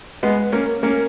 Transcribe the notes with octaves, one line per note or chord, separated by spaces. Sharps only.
G#3 B3
A#3 C#4
A#3 C#4